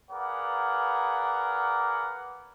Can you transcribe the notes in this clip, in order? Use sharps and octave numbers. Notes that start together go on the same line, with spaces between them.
G#4 A#4 B4 D5 F5 F#5